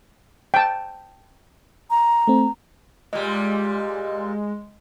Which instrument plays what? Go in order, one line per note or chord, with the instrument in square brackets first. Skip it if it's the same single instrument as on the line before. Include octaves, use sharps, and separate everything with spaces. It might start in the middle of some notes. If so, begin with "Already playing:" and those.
[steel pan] G5 A5
[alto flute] A#5
[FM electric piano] A3 C4
[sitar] A#2 G3 [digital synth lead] G#3